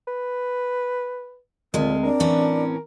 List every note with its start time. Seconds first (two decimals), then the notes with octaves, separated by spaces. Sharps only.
0.08 B4
1.74 D2 A#2 G#3 C4 A#4
2.03 D4 A#4
2.20 A2 E3 C#4